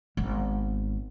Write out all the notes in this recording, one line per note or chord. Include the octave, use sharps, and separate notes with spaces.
G#1 B3